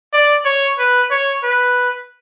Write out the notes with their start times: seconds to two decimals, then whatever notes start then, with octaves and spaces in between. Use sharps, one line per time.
0.13 D5
0.45 C#5
0.79 B4
1.11 C#5
1.44 B4